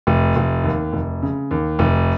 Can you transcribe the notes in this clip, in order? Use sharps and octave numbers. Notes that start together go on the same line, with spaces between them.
F1
F1
D#2
F1
C#3
D#2
F1